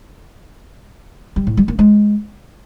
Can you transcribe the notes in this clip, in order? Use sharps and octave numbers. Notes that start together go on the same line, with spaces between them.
G3
A2
G3
A#3
G#3